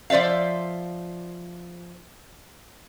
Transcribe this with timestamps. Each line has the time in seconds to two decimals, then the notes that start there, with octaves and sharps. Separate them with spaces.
0.10 F3 C5 D5 E5 F5